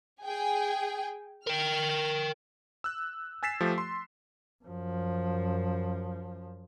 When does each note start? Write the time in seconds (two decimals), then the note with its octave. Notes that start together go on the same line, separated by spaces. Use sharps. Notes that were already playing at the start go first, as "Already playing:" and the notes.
0.24 G#4 G5 G#5
1.47 A#4 G5 F6
2.84 E6 F#6
3.43 G#5 E6 A6 B6 C7 E7
3.61 F3 A3 G4
3.78 C6
4.64 F#2 F3